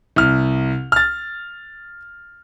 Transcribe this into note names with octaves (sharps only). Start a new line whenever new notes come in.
C2 F6
F6 A6